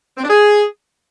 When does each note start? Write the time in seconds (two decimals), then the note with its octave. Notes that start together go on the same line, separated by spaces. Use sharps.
0.17 C4
0.23 D4
0.29 G#4